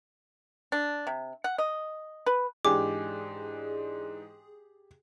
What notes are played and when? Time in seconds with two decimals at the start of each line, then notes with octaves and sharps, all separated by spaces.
0.72 D4
1.07 C3
1.44 F#5
1.58 D#5
2.26 B4
2.65 G#2 E3 D4 G4 G#4 G#5 D6